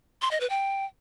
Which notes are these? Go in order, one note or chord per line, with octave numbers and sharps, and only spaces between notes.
C6
D#5
B4
G5